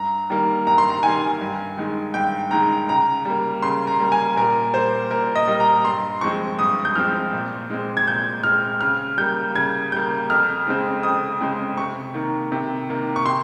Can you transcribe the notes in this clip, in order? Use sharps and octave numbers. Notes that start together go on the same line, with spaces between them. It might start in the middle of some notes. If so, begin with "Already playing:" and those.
Already playing: G2 A#5
D#3 G3 A#3
G2 A#5
C6
A#5
D#3 G3 A#3 G#5
G2
D#3 G#3
G2 G5
D#3 G#3 A#5
C#3 A#5
G3 A#3
C#3 C6
A#5
G3 A#3
G#5
A#2 A#4
G3 A#3 C5
A#2 A#4
D#5
G3 A#3
A#5
G2 C6
F3 G#3 C4 C#6
G2 D#6
G6
F3 G#3 C4 F6
A#2
G#3 C4
G#6
A#2 G6
G#3 C4 F6
C#3 F6
G3 A#3 G6
C#3 G#6
G3 A#3 G6
F2 F6
C#3 G#3 C4
F2 D#6
C#3 G#3 C4
C3 C#6
D#3 A#3
C3
D#3 A#3
C#6
C3 C6